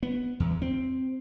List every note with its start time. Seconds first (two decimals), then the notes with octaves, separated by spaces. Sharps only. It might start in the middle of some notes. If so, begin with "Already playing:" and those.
0.03 B3
0.40 E2
0.62 C4